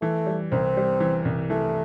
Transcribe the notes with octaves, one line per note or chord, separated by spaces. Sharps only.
E3 A3
G3
C2 C4
G3
E3
C2
E3 A3